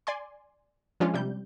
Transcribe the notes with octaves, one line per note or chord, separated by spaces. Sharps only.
D5 G#5 C6
F3 G#3 C#4 D4 F4
C3 G3 G6